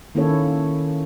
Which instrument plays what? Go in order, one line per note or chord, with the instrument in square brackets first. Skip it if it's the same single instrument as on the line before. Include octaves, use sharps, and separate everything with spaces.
[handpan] D#3 A#3 C#4 E4 A4 C#5